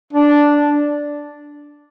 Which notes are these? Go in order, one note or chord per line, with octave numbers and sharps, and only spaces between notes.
D4